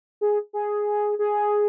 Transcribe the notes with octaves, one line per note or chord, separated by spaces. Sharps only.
G#4
G#4
G#4